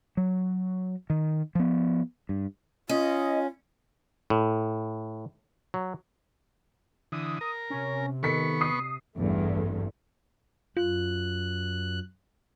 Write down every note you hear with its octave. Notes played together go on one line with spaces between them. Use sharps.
F#3
D#3
F3 B3
G2
C#4 F4 D#5
A2
F#3
D3 E3 D#6
A#4
C3 C#4
D#3 B3 A4 C#6 B6 C#7
D#6 C7
A1 E2 G2 A3
F#2 F4 F#6